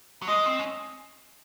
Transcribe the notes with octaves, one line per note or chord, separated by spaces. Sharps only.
F#3
G#3 D#5
C4
C#4